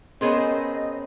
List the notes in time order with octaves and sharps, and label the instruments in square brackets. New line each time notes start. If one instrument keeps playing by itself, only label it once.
[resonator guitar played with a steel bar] B3 G#4 C5 [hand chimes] C#4 A#4 C#5 [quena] D#5